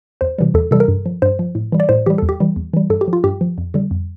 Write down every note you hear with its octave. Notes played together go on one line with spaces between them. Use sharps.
E2 C5
C3 E3 G3
E2 A4
C3 E3 G3 A4
A#4
G2
F3
G2 C5
F3
A2
E3 G3
D5
A2 C5
E3 G3 G4
E2 A4
G4
E3 G3
E2
E3 G3
G2 A4
G4
F3
F4
G2 G4
F3
F2
D3 G3
F2